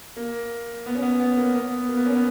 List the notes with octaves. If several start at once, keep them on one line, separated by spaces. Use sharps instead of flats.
A#3
B3
C#4
B3
B3
A#3
B3
A#3
B3
C#4
B3